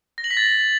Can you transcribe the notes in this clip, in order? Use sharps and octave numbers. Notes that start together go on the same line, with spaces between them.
A#6
F#7
B6
A6